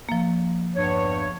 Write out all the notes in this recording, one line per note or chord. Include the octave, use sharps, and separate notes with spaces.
F3 A#3
E2 G2 C#5